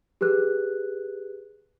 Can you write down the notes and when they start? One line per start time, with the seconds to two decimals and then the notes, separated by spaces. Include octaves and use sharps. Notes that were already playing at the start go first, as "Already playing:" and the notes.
0.21 G4 G#4 B4 F#6